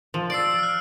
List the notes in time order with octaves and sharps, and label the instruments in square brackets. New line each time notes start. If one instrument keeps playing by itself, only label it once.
[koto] F3
[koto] D5 [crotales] E6 C7 D7
[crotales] F6 F#6